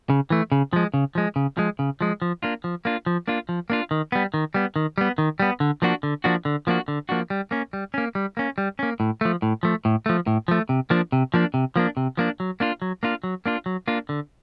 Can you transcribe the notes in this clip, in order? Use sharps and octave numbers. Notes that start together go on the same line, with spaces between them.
C#3
E3 A3
C#3
F3 G#3
C#3
F3 G#3
C#3
F3 G#3
C#3
F3 G#3
F3
A#3 D4 F4
F3
A#3 D4 F4
F3
A#3 D4 F4
F3
A#3 D4 F4
D#3
G3 B3
D#3
G3 B3
D#3
G3 B3
D#3
G3 B3
D3
F3 A#3 D4 F#4
D3
F3 A#3 D4 F#4
D3
F3 A#3 D4 F#4
D3
F3 A#3 D4 F#4
G3
A#3 C#4
G3
A#3 C#4
G3
A#3 C#4
G3
A#3 C#4
A2
F3 A3
A2
F3 A3
A2
F3 A3
A2
F3 A3
C3
F3 A#3 D4
C3
F3 A#3 D4
C3
F3 A#3 D4
C3
F3 A#3 D4
F#3
A#3 D4 F4
F#3
A#3 D4 F4
F#3
A#3 D4 F4
F#3
A#3 D4 F4
D3